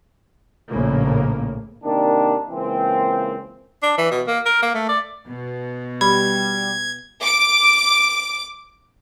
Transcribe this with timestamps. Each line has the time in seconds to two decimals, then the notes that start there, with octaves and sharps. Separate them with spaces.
0.69 A#1 A2 C#3 A#3
1.84 C3 D#3 A#3 D4
2.50 C#2 E3 A#3 C4
3.83 D4
3.98 E3
4.11 B2
4.27 A#3
4.46 A#4
4.63 A#3
4.75 A3
4.89 D5
5.26 B2
6.01 G3 B5 G#6
7.22 D6 D7